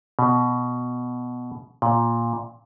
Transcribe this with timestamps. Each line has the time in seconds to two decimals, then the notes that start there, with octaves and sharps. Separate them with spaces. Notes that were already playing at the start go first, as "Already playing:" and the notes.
0.19 B2
1.82 A#2